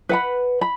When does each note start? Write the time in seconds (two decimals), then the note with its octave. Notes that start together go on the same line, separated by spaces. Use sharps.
0.09 B4 F#5 B5
0.61 B5